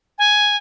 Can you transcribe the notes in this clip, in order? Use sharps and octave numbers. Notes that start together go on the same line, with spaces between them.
G#5